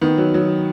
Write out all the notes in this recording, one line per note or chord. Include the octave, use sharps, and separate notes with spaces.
D#3 B3
F#3
F#3